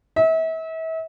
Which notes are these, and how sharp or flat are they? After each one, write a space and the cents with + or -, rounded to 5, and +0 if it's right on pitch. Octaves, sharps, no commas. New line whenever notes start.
E5 -35